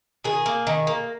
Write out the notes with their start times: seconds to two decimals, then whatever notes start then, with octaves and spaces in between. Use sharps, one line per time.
0.24 D#3 G#4
0.46 A#3
0.67 D#3
0.87 A#3